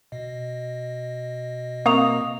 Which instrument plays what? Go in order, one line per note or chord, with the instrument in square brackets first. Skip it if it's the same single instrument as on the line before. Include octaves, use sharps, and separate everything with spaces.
[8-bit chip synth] B2 D#5
[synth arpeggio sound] A#3 [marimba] C4 E5 [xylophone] C#6 D#6 F7